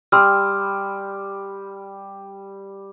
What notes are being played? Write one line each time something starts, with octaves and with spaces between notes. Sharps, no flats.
G3 C6 E6 F6